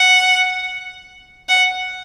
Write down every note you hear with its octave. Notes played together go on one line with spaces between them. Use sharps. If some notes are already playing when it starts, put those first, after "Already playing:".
Already playing: F#5
F#5